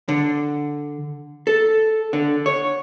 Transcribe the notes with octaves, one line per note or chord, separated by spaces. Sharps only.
D3
A4
D3
C#5